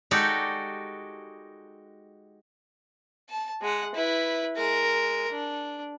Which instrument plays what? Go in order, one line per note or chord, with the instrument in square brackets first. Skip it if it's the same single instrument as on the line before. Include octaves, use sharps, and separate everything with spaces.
[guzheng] G#3 D#4 F#4 G4 A4 D5
[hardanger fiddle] A5
G#3 F#5
E4 B4
G#3 A#4
D4